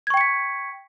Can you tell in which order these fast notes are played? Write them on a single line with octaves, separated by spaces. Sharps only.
G#6 C#6 G5 C#7 B6